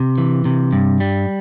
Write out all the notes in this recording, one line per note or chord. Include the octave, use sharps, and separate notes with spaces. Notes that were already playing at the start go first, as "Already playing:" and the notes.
Already playing: C3
E3
C3
G2
G3